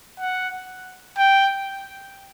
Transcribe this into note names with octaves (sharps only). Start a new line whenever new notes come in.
F#5
G5